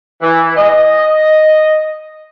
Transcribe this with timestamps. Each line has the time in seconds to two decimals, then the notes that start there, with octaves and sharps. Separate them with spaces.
0.22 E3
0.56 D#5